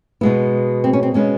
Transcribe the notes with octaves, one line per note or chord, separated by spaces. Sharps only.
B2 G#3 B3 E4
C4
C#4
C4
B2 G#3 B3 C#4